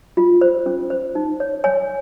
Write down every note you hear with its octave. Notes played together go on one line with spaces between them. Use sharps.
F4
C5
C#4
C5
D#4
C#5
C#5 G#5